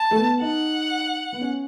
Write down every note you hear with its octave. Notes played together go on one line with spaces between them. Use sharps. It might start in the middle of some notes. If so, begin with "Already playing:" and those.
Already playing: A5
A3
B3
D#4 F#5
B3
C#4